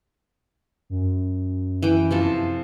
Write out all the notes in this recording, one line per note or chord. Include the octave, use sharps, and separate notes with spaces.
F#2
E3 G5
C3 F3 A4